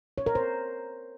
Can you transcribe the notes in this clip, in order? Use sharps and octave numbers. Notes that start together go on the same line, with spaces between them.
C#5
A#4
C5